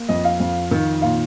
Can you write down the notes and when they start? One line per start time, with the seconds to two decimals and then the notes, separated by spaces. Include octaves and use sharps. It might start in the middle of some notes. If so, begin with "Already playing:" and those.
Already playing: A#3
0.08 F2 D#5
0.24 F5
0.40 F2
0.71 D#3
1.02 A#2 F5